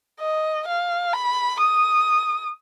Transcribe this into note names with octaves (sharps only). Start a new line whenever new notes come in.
D#5
F5
B5
D#6